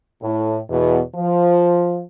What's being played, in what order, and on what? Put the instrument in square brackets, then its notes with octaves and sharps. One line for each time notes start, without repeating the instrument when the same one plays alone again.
[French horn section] A2
E2 B2
F3